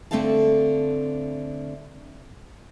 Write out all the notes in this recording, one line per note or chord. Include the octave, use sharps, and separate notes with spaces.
D3 A3 C4 A4 F5 A5